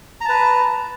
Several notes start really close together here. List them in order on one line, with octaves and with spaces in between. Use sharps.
A#5 A5 B4